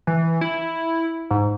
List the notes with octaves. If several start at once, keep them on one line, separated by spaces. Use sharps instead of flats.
E3
E4
G#2